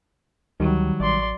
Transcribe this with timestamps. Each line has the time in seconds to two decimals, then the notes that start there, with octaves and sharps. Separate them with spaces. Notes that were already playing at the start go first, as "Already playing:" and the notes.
0.60 D2 D#3 F#3 G3
1.00 A1 D5 C6